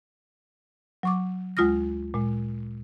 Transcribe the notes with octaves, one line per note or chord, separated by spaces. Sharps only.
F#3 C#6 D6
D2 G#3 F4 D#6 F6 A#6
A#2 G#3